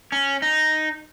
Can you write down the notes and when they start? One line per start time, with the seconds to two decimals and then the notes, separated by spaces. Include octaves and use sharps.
0.12 C#4
0.42 D#4